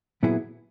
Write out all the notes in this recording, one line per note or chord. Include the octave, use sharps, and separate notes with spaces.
A#2 F#3 B3 E4 G#4